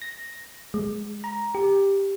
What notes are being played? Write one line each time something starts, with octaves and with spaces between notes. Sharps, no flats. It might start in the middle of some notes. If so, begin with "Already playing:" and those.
A#6
G#3
A#5
G4